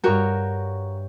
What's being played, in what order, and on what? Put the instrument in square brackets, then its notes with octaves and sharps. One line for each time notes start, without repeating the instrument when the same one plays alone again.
[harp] G2 C#5 G5 [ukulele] F#4 A#4